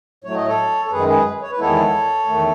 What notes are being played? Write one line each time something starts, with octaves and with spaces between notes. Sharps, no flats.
A2 F#3 A3 C#5
D#5
A4 C#5
A4
F#2 D#3 G#3 G#4 B4
G#4 B4
C#5
B4
E2 D#3 G#3 B3 E4 A4 C#5
E2 D#3 A3